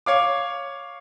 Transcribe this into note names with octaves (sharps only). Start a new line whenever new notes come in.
C#5 F5 D6